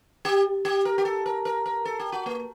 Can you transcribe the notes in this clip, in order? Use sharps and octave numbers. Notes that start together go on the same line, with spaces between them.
G4
G4
A#4
G4
A4
A#4
A#4
A#4
A4
G4
F#4
A#3